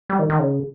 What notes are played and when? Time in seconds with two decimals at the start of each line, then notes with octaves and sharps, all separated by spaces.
0.10 G3
0.19 D#3
0.30 D#3
0.39 C#3